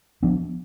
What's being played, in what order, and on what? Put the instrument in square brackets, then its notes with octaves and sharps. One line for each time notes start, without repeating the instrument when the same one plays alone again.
[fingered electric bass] F3 B3 D4